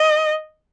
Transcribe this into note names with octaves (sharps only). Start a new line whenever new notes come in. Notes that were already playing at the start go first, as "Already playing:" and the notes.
Already playing: D#5